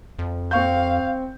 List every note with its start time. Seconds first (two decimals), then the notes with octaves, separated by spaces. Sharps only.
0.19 F2
0.51 C4 F5 C#6 G6